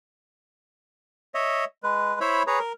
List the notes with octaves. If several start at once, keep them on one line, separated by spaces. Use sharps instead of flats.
C#5 D#5 E5
G#3 B4
E4 C5 C#5 E5 B5
G#4 B4 C#5 A#5
A#4